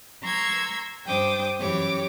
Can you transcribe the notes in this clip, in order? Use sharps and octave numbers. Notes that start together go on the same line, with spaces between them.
A#5 C6 C#6 E6 G#6
G2 D4 C5 G5 D6 D#6
F#2 E3 G4 C#5 D6